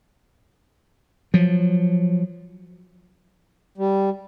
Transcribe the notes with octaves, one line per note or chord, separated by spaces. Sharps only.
F3 F#3
G3